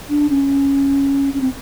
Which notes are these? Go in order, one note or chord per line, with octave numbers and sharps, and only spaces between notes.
D4
C#4
C#4
C4